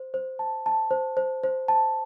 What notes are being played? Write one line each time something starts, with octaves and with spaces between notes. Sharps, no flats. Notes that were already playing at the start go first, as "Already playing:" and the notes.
Already playing: C5
C5
A5
A5
C5
C5
C5
A5